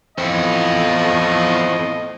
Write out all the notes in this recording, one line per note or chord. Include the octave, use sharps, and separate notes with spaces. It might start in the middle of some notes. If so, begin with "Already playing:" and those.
E2 A2 C4 F4 D#5